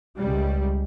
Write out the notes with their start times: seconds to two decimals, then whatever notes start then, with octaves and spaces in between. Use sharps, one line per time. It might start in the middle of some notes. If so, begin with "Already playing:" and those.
0.19 C#2 G3